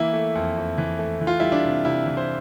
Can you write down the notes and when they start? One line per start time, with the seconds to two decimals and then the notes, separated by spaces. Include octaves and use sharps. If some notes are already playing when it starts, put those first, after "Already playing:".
Already playing: E3 A#3 E4
0.13 A3
0.35 F2
0.57 F2
0.78 E3
0.99 A3
1.21 E3
1.27 F4
1.40 G3 E4
1.52 D4
1.64 C3
1.85 C3 E4
2.06 E3
2.17 C5